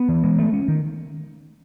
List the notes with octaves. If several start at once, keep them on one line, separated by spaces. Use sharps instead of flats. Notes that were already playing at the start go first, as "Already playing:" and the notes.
Already playing: B3
E3
G#3
A3
C#4
D#3